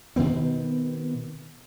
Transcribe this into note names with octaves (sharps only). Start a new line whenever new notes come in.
B2 D#3 B3 C4